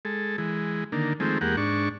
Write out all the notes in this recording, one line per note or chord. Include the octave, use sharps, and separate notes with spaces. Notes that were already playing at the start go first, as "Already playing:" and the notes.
G#3 A4
E3 G#3
D3 D#3 A#3
D#3 F3 G#3 A3 C4
E2 G#3 A#3 G4 F#5
G#2 D4 C#6